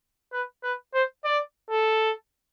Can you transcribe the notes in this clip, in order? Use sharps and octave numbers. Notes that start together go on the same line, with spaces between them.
B4
B4
C5
D5
A4